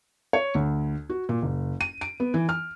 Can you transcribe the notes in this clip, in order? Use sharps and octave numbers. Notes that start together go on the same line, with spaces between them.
C#5
D2
F#4
A#2
F#1
D#7
D7
B3
E3
F6